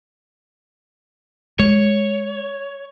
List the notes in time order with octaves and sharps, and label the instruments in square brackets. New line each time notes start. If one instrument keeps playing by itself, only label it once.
[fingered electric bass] G#3 [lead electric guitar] C#5